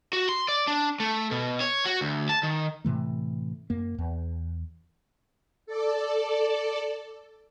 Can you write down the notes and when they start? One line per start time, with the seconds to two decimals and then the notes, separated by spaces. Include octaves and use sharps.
0.13 F#4
0.29 C6
0.49 D5
0.68 D4
1.00 A3
1.31 B2
1.60 C#5
1.86 F#4
2.01 D2
2.29 A5
2.43 D#3
2.85 A2 C3 E3 A3
3.70 F#2 A#3
3.98 E2
5.66 A4 D5